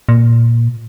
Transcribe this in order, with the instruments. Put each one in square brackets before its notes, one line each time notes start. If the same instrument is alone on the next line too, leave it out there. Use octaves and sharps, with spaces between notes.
[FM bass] A#2